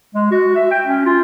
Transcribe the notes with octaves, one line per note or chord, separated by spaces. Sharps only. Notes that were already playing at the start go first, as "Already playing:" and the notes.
G#3
F#4
E5
G5
C#4
F4